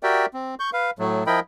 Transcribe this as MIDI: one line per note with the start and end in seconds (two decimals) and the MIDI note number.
0.03 0.26 66
0.03 0.26 67
0.03 0.26 70
0.03 0.26 74
0.03 0.26 76
0.03 0.26 79
0.34 0.55 60
0.60 0.70 85
0.60 0.70 91
0.73 0.91 71
0.73 0.91 77
0.99 1.24 45
0.99 1.24 54
0.99 1.24 57
1.27 1.40 53
1.27 1.40 64
1.27 1.40 70
1.27 1.40 75
1.27 1.40 79
1.27 1.40 83